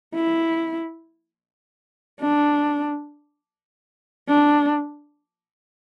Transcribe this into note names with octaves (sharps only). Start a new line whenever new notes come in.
E4
D4
D4